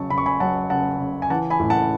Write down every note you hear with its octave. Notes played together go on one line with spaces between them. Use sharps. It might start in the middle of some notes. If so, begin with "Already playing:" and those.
Already playing: C#3 F#3 A5 C#6
C#3 B5
C#6
G#5 B5
F#3 F#5 A5
C#3 F#5 A5
C#3
G#5
E3 F#5 A5
G#5 B5
A2
F#5 A5